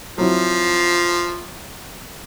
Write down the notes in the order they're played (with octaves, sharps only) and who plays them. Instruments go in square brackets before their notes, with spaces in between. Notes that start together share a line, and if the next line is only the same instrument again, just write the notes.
[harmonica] F3 [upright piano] F#3 C4 E4